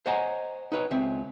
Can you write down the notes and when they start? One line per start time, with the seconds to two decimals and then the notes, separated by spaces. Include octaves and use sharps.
0.06 C5 C#5 D#5 F#5 G#5 A#5
0.72 D#4 B4 C#5
0.91 C#2 C4 E5